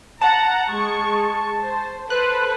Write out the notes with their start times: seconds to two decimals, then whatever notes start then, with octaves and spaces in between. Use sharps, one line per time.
0.21 F#5 A5 A#5
0.68 G#3 C#6
1.60 C5
2.10 A4 B4 C5 F#6